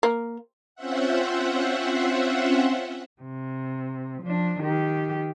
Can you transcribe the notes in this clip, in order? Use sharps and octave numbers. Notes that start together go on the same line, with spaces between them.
A#3
C4 C#4 F4 C5 E5 F#5
C3
F3 D4
D#3 G4